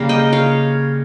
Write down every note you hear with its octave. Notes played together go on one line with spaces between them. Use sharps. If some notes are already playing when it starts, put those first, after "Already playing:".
Already playing: C#3 G3 A#3 F5 A#5
D#5 G5
C#5 F5